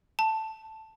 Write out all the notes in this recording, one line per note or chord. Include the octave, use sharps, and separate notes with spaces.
A5